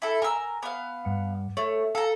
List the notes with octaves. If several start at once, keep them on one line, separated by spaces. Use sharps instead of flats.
E4 A4
A#4 G#5 A#5 E6
B3 F5
G2 F#5
A3 C#5
A4 F5 A#5